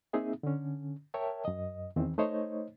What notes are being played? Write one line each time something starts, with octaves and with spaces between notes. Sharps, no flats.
A#3 C4 D#4 G#4 E5
D3 C#4
A#4 C#5 E5 G5 A5
F#2 D#5
E2 D#3 E3 C4
A3 D#4 C5 C#5 D#5